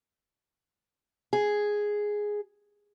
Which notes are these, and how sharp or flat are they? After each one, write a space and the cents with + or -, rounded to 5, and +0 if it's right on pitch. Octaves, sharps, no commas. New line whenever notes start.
G#4 +0